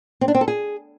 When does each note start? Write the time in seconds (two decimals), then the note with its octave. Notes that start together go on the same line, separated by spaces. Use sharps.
0.21 C4
0.28 D4
0.34 C4
0.41 A4
0.48 G#4